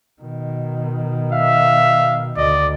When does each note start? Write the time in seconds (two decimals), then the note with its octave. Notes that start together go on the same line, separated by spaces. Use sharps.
0.21 B2 D#3
1.32 E5 F5
2.37 D2 D5 D#5